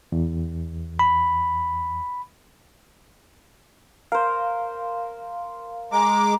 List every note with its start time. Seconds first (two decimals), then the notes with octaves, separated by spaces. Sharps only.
0.12 E2
0.99 B5
4.12 A#4 C5 F5
5.92 G#3 A#5 D6